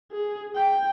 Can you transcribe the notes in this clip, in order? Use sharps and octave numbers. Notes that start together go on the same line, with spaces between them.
G#4
G5